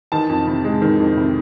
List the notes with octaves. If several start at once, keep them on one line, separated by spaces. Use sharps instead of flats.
D#3 A5
F2
C3
G#3
D#3
F2
C3